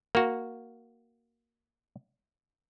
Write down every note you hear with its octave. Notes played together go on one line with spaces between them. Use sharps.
A#3 F#4